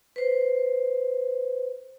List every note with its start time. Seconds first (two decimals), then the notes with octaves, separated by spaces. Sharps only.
0.16 B4 C5